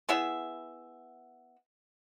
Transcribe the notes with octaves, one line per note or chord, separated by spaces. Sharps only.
B3 E4 G#4 E5